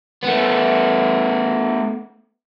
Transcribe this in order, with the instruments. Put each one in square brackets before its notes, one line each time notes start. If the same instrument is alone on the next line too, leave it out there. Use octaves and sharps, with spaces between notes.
[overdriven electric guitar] A3 B3